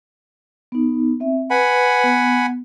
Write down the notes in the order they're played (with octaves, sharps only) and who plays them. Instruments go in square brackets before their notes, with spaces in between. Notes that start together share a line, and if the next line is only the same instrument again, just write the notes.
[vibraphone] B3 D#4
C4 E5
[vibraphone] B4 [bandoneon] F#5 G#5 B5
[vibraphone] B3